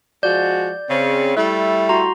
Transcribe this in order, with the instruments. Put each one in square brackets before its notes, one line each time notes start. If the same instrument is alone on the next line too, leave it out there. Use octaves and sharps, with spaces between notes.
[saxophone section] F3 G#3 F#4 [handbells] D5 G6
[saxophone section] C#3 C4
G3 A3 E4
[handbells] F#4 A#5 C6